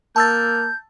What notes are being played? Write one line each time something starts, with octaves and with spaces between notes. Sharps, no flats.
A#3 A5 E6 G6 A6